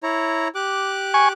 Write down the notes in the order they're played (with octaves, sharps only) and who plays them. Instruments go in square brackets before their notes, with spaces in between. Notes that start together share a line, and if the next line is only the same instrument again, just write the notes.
[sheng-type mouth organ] E4 C#5 A#5
G4 D6 F#6
[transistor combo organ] G#5 C#6